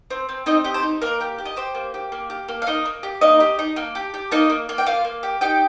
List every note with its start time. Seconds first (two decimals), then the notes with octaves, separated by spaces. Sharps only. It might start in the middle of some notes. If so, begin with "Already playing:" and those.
0.10 C4
0.29 C4
0.46 C4 D#4 D#5
0.64 G4 D#5
0.74 C5
0.83 D#4
1.02 A#3 A#4
1.21 G4
1.38 G4
1.45 D#5
1.56 G4 C5
1.75 A#3
1.94 G4
2.12 A#3
2.30 G4
2.48 A#3
2.62 F5
2.67 A#3 D#4 D#5
2.85 A#3
3.03 G4
3.21 A#3 D#4 D#5
3.40 G4
3.59 D#4
3.76 A#3
3.95 G4
4.14 G4
4.31 A#3 D#4 D#5
4.49 A#3
4.69 A#3
4.78 G5
4.86 A#3 F4 F5
5.04 A#3
5.23 G4
5.41 D#4 G4 G5